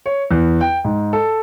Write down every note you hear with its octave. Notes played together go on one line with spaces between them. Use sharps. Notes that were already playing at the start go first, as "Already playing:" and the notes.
C#5
E2
G5
G#2
A4